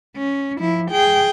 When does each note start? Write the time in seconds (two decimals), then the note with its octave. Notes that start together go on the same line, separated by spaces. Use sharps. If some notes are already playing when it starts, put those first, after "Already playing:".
0.16 C#4
0.59 F3 E4
0.91 G#4 G5